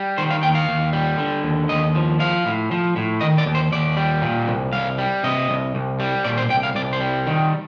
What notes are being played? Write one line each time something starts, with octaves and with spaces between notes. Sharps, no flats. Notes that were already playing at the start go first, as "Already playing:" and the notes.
Already playing: G3
D#3 C5
F5
D#2 G5
F5
D#2
G3
D3
D#2
D#2 D#5
F3
F3 F5
A2
F3
A2
D#3 D#5
D5
D#2
C5
D#2 D5
G3
A#2
C2
C2 F5
G3
C3 D#5
C2
C2
G3
A#2 D5
C5
C2 G5
F5
C2 D5
C5
G3
D#3